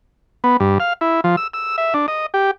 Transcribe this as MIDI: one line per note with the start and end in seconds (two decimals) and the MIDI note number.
0.44 0.57 59
0.60 0.78 43
0.80 0.93 77
1.01 1.21 64
1.24 1.36 53
1.37 1.47 88
1.54 1.76 88
1.78 1.94 76
1.94 2.06 62
2.08 2.26 75
2.34 2.51 67